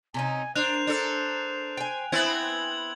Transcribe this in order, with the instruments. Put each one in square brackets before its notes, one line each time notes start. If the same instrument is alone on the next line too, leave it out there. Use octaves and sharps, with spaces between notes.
[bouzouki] C3 C#4 D#4 [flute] G#5
[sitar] D4 [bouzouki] A#4 [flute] C5 [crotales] F#6 F7
[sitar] D4 A4
[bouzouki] G5 G#5
[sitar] B3 C4 E4 [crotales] G#6 F#7